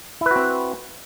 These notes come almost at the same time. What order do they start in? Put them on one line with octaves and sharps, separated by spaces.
E4 B4 F#4 C4